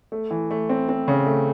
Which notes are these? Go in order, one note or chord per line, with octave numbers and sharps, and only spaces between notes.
A3
E3
A3
C4
C4
C#3
A3